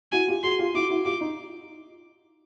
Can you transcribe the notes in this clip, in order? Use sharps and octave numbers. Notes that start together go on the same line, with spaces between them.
E4 F#4 G#5
F4 G4
F#4 G#4 C6
F4 G4
E4 F#4 D6
E4 F#4
F4 G4 D6
D#4